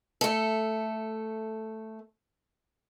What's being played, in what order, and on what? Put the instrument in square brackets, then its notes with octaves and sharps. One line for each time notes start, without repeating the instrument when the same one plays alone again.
[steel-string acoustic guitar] A3 A4